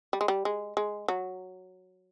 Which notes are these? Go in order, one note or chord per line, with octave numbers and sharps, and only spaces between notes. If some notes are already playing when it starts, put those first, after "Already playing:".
G3
G#3
G3
G#3
G#3
F#3